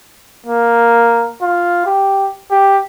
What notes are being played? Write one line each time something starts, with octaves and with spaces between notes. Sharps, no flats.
A#3
F4
G4
G4